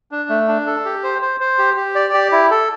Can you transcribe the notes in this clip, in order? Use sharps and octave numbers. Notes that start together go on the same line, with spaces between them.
D4
A3
D4
A4
G4
C5
C5
C5
G4
G4
D5
G4
E4
A4